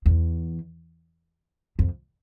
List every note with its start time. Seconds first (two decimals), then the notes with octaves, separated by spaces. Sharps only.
0.06 E2
1.79 F2